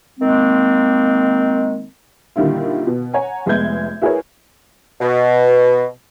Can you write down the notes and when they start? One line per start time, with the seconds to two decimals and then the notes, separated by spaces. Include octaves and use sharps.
0.19 D#3 G#3 A#3 C4
2.36 A#2 D3 D#3 G3 E4 F4
2.87 B2
3.13 C#5 F#5 G#5 A#5
3.46 F1 G#3 B3 E5 G6 G#6
4.02 E4 F#4 G#4 A#4 B4 C#5
5.01 B2